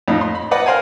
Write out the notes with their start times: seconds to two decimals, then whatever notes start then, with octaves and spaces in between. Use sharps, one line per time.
0.08 F2 A2 D#4 F5
0.21 C6
0.35 B5
0.51 B4 C5 D5 D#5 F#5
0.66 A#4 C5 F5 G5 G#5